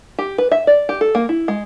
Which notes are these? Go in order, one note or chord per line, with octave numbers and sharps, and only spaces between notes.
G4
B4
E5
D5
G4
A4
A#3
E4
G#3